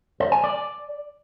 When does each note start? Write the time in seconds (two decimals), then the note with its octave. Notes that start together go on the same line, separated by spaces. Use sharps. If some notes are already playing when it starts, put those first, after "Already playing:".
0.20 C5
0.32 G#5
0.44 D5